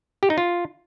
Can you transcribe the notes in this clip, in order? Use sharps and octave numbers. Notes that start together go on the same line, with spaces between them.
G4
D#4
F4